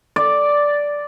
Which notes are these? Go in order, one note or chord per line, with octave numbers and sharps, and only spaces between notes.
D5